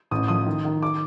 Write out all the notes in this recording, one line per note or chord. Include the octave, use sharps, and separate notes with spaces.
A1 D#6
F3 D#6
D#3
D#3
D6